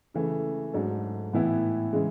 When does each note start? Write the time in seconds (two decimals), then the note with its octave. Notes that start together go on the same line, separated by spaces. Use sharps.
0.14 C#3 E3 A3
0.73 G#2 F#3 A3 D4 A4
1.33 A2 E3 B3 E4
1.93 C#3 E3 G#3